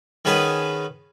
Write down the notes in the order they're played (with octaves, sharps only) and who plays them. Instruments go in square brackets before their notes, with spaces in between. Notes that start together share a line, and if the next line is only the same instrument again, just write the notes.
[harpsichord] D#3 B3 C#4 G#4 B4